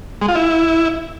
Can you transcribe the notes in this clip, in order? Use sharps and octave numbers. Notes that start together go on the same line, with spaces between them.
G#3
F4
E4